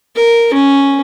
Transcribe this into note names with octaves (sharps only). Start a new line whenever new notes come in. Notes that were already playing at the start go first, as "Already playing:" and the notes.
A#4
C#4